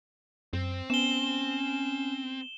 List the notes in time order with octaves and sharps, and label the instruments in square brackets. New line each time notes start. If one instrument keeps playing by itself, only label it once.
[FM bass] F#2 [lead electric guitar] C4
[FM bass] B3 [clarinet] C#4 [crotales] E7 G7